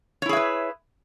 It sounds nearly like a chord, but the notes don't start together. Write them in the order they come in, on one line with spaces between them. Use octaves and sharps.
C#5 E4 G#4 E5 B4